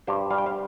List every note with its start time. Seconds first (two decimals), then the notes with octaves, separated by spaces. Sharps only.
0.07 G2 G4 C5
0.31 G3 F5
0.38 G5
0.46 C5 F5